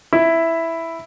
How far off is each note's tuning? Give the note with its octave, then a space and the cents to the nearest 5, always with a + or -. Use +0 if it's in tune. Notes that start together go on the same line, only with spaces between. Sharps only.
E4 +0 E5 +0